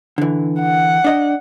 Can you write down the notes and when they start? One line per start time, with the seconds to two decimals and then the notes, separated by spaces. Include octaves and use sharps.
0.18 D3 E3
0.60 F#5
1.04 D4 D#5